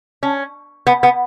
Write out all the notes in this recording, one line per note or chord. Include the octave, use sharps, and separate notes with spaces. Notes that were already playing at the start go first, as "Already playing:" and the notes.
C#4
B3
B3